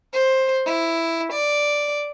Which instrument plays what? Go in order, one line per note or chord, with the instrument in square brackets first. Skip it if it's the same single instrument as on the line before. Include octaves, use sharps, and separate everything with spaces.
[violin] C5
E4
D5